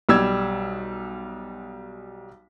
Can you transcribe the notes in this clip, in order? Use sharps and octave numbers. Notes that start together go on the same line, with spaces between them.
B1 G3 E6 G#6